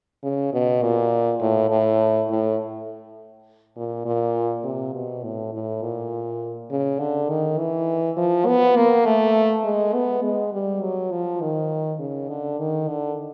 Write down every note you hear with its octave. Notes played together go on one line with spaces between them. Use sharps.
C#3
B2
A#2
A2
A2
A2
A#2
A#2
C3
B2
A2
A2
A#2
C#3
D3
D#3
E3
F3
B3
A#3
A3
G#3
B3
G#3
G3
F#3
F3
D#3
C#3
D3
D#3
D3